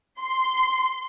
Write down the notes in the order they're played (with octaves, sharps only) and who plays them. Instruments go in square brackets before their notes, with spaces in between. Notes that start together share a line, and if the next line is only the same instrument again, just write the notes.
[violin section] C6